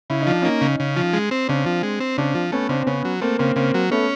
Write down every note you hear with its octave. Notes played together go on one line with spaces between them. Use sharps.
C#3 E4
D#4
F3 D4
A#3 C#4 D#4
C#3
C#3
F3
G#3
C4
C#3 C4 D4
F3
G#3
C4
C#3 C4 D4
F3
A3 B3 C#4
C#3 C4 D4
C4
C#3 B3 C#4
F#3
A3 A#3 C4
C#3 A#3 C4
C#3 A#3 C4
F#3
A3 B3 C#4